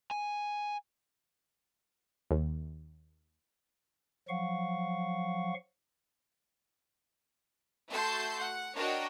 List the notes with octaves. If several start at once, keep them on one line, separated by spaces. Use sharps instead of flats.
G#5
D#2
F3 F#3 F5 F#5 C#6
A3 F#4 A4 A5 C6 G6
F#5
D4 F#4 A#4 C#5 D#5 G5